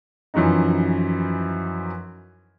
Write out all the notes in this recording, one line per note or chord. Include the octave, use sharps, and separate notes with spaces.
F#2 E3 F3 C#4 D#4